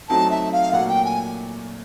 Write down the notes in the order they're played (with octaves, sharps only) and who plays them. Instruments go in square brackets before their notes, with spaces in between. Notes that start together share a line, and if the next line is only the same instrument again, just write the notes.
[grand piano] F#3 A3 C4 D#4 [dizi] A5
[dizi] E5
F5
[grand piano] A#2 F#3 A3 [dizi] F#5
[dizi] G5
G#5